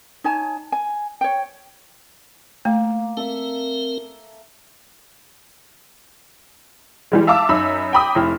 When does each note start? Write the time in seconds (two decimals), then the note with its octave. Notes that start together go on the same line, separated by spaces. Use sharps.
0.24 D#4 C#5 G#5 A5
0.72 G#5
1.21 C#5 G5
2.65 A3 A#3
3.17 C4 A4 A#4 E5
7.12 E3 G3 G#3
7.27 E5 F5 A5 D6 E6
7.49 F#2 D#4 E5 B5
7.93 G5 A#5 B5 D6 D#6
8.15 F1 E4 F6